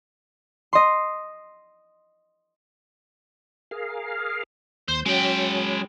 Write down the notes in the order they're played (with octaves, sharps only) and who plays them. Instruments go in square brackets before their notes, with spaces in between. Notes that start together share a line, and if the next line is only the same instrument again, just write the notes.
[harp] D#5 C6
[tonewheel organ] G#4 A#4 F5
[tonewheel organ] D#2 G6 [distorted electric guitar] C5
[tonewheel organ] F#3 C#4 [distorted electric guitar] G#3 G5